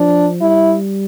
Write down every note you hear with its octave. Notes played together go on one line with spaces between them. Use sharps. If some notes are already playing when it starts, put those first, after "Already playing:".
Already playing: F3 D4
G3 E4